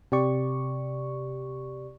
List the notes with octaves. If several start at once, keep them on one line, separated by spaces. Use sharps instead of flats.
C3 G4 D5 C#6